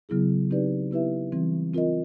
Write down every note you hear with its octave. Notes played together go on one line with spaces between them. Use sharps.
C#3 F#3 B3 E4 G#4
C4 D#4 G4 B4 D5
B3 E4 G4 B4 E5
E3 G3 C4
C4 F4 A#4 D#5